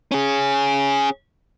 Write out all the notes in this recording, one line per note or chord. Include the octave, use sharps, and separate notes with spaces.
C#4 G#4